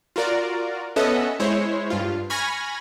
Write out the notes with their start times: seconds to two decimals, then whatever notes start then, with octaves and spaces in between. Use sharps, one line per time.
0.16 F4 F#4 A#4 D5
0.96 B3 C#4 A4 D#5 E5 F#5
1.40 G#3 E4 C5 C#5
1.90 G2 F4
2.30 G#5 B5 C#6 F6 G#6 A#6